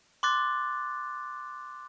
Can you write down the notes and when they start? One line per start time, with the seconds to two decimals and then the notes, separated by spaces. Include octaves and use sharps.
0.23 C6 D6 F#6 A6